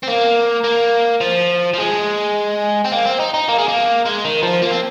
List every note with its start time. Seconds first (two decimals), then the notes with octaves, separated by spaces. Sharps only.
0.03 C4
0.08 A#3
0.64 A#3
1.21 F3
1.74 F3
1.78 G#3
2.85 C4
2.92 A#3
3.06 C4
3.20 D#4
3.34 D#4
3.49 A#3
3.59 G#3
3.68 A#3
4.05 G#3
4.24 D#3
4.43 F3
4.62 A#3
4.71 C4